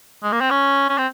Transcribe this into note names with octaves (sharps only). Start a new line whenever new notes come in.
G#3
A#3
C4
C#4
C#4
C4